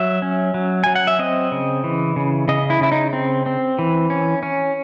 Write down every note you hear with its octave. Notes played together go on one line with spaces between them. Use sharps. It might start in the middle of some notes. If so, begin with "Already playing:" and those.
Already playing: F#3 E5
C#4
F#3
F#3 G#5
F#5
E5
C4 D#5
C#3
E3
C#3
C#3 D#5
E4
C#3 E4
D#4
C4
C4
E3
C#4
C#4